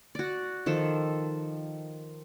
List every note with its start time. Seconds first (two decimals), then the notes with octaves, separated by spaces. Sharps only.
0.15 F#4 D5
0.66 D#3 F3 A4